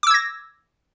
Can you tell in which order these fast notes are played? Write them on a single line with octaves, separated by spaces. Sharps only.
D6 E6 G#6 A#6